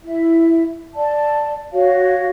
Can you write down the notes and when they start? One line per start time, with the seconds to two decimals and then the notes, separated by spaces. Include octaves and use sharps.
0.04 E4 E5
0.95 D5 A5
1.72 F#4 C#5 F5